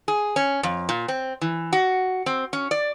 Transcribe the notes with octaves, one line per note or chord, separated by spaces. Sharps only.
G#4
C#4
F2
A#2
C4
E3
F#4
C4
C#4
D5